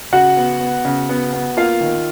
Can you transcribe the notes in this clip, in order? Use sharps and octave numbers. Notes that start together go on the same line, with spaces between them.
C#3 F#4 F#5
B3
B3
C#3
B3
B3
A#3 F4 F5
D#3